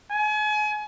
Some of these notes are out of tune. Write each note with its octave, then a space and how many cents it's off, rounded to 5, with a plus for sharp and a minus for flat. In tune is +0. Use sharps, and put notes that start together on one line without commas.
G#5 +35